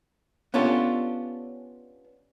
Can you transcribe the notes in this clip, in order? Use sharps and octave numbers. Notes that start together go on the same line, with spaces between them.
B3 C#4 D4 F4 G4 A4